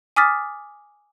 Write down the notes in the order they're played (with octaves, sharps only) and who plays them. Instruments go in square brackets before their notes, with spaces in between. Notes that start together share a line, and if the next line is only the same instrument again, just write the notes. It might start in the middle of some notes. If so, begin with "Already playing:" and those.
[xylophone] G#5 D6 D#6 F6 A6 B6